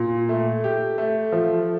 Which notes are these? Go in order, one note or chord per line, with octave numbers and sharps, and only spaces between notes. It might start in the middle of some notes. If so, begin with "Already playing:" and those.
Already playing: A#2
A3
G4
A3
F3